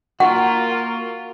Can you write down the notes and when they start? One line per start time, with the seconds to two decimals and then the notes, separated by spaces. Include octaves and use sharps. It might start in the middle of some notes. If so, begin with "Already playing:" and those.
0.20 A#3 F4 F#4 F#5